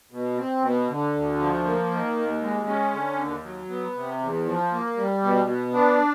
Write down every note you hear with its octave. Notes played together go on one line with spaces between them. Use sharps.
B2
C4
B2
D3
D2
F3
A#3
D#3
D#2
G#3
C#4
D3
D#2
F#3
B3
C3
E2
F3
A#3
G3
B2
B3
D4